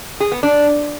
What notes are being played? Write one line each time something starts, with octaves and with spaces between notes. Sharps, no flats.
G#4
B3
D4